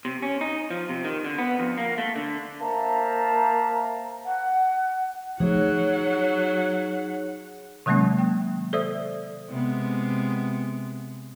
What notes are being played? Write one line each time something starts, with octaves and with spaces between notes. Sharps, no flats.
C3
C#4
D#4
F3
C3
D#3
D3
B3
F2
A#3
A3
D3
A#3 C5 E5 F5 A5 A#5
F#5
F3 F#3 A3 D#4 G#4 C#5 F#5
C3 D#3 F#3 G#3 A#3 C#4
G5
A4 C5 D5 E5 D#6 E6
C3 G#3 B3